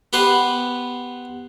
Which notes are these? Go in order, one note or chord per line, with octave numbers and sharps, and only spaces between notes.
B3 G4 B4 C5